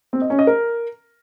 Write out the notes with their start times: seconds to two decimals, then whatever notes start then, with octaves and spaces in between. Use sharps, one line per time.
0.13 C4
0.22 D#5
0.30 C#4
0.39 D#5
0.47 A#4